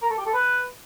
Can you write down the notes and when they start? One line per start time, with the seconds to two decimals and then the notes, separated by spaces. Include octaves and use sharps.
0.02 A#4
0.10 A4
0.18 G4
0.26 A4
0.34 B4